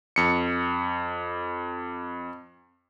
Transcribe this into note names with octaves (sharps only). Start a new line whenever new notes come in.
F2 C#7